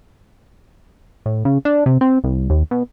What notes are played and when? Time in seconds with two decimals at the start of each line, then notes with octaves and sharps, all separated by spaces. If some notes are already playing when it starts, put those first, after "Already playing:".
1.26 A2
1.45 C#3
1.65 D4
1.86 C3
2.01 C4
2.24 C2
2.50 D#2
2.71 B2